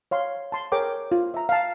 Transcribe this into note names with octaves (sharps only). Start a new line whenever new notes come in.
C#5 F5 C6
A5 C6
G#4 A#4 C#5 G5 D6
F4
E5 A#5
F5 A5